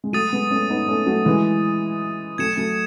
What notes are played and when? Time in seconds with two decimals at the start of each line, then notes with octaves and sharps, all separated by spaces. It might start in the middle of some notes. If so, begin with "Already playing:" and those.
0.04 G#3
0.13 F#3 A3 D#6 A6 D#7
0.32 G#3 B3
0.50 A3 C#4
0.70 B3 D#4
0.88 A3 C#4
1.07 F#3 A3
1.26 E3 G#3
2.38 F#3 A3 G#6 C#7 E7
2.57 F#3 A3